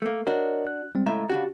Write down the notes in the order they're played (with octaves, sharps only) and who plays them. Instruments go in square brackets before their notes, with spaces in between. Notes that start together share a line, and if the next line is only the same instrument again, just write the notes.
[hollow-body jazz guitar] A3 A#3
[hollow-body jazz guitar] D4 F#4 [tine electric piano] A#4 C#5 D#5
[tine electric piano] F#6
G3 G#3 C4
[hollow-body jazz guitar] C#2 A2 E5 [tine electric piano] A#5
[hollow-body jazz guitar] C#3 D4 F#4 [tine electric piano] G4